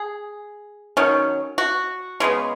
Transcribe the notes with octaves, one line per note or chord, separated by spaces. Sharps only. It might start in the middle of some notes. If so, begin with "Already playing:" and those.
Already playing: G#4
D#3 F#3 C#4
F#4
C#3 G#3 B3